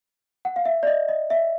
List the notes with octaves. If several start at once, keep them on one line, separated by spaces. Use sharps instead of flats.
F#5
F5
E5
D5
D#5
D#5
E5